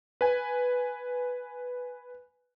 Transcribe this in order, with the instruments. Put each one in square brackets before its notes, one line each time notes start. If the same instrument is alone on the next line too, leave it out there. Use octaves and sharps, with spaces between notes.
[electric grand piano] B4 G#5